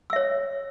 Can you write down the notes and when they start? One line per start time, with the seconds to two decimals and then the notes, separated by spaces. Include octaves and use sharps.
0.10 E6
0.13 E5
0.16 C#5